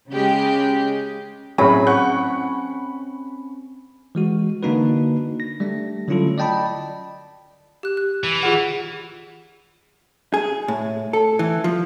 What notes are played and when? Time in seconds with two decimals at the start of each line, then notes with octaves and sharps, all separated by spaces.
0.10 C#3 G#3 G4
1.58 A2 F#3 C4 C#4 G#4 B5
1.87 F#5 C#6 F#6
4.15 E3 G#3 F#4
4.63 D3 A#3 D4 D#4 F#4 B4
5.40 A#6
5.60 G3 A3 D4
6.08 D3 F#3 C#4 E4 F4 A4
6.38 D5 D#5 G5 A5 B5
7.83 G4 F#6
7.97 F#6
8.24 E3
8.43 F4 G#4 F#5
10.34 G#4
10.68 A2
11.13 A4
11.39 E3
11.64 F3